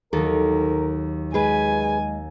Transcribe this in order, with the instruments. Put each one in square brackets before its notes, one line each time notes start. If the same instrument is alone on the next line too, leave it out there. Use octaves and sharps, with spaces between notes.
[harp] D#2 F#3 [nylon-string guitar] A4 [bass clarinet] A#4
[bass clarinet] G#3 [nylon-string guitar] G#4 B4 [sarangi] G#5